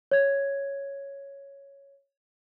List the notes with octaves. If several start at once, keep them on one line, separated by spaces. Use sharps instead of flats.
C#5 G#6